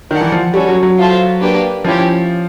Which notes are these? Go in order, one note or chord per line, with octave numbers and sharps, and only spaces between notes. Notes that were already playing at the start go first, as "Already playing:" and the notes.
D#3 G4 A#4 D5 F#5 A5
E3
F3
G3 C#4 F#4 A4 C#5
F#3
F#3
F4 A4 C5 E5 A5
A#3 D4 G4 B4
F3 C#4 E4 G4